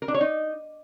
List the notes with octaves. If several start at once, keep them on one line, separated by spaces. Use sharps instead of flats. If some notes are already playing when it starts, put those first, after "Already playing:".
A#4
D4
C#5
D#4